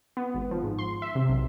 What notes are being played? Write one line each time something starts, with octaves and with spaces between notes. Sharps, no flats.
B3
G#1
F3
G#2
C6
E5
C3
B1